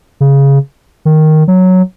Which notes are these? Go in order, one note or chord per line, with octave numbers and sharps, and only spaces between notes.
C#3
D#3
F#3